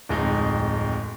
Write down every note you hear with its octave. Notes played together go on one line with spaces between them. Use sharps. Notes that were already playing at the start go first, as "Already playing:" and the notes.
D1 F2 G#3 D#4